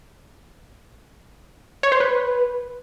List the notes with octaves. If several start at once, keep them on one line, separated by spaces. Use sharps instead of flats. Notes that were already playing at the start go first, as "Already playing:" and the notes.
C#5
C5
B4